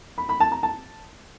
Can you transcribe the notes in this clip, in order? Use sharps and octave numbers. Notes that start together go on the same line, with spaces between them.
B5
B5
A5
A#5
A5